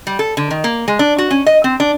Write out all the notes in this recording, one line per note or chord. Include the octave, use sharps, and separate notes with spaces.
G3
A4
D3
D#3
A#3
G#3
D4
F#4
C#4
D#5
C4
D4